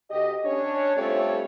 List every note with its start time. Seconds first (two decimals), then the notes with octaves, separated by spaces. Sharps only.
0.11 D2 G4 D#5
0.45 C#4 D4 C#5
0.96 G3 A3 C4 F4 A4 C#5